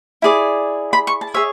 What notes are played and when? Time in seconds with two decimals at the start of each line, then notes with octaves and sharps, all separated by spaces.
0.22 E4 G#4 D5
0.93 B5
1.07 C#6
1.21 A5
1.34 G#4 C#5 E5